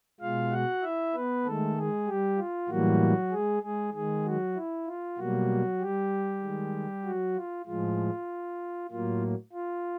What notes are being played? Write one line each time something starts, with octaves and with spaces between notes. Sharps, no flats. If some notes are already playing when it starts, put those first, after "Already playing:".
B2 G#3 F4 F5
F#4 F#5
E4 E5
B3 B4
D#3 G#3 A3 A4
G#3 G#4
G3 G4
F4
A2 E3 F#3 G3 A#3 F#4
G#3 G#4
G#3 G#4
D#3 G#3 G#4
F#3 F#4
E4
F4
B2 F#3 G3 A#3 F#4
G3 G4
D#3 G#3
F#3 F#4
F4
A2 F3 G#3 F4
A2 F#3 A#3 F4
F4